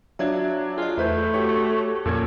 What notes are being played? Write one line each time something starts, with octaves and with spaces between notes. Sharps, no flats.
F#3 D4 F4 C#5 E5 G#6
F4 G#4 D#5
E2 A3 E4 B4 C5 E5 G6
F#4 G4 C#5 C#6
F2 A#2 C#4 A4 G#6